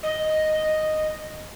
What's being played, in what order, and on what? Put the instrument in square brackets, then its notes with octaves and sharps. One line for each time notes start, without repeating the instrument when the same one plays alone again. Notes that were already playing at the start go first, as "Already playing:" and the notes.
[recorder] D#5